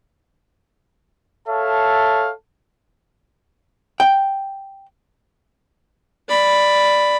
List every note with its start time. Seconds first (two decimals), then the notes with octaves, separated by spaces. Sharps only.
1.49 A4 C#5 E5 F5 A5
4.00 G5
6.29 D5 B5